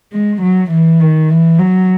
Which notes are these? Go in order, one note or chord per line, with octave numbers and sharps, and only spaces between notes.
G#3
F#3
E3
D#3
E3
F#3